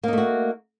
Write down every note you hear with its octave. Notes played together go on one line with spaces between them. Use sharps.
A3 A#3 D#4 F#4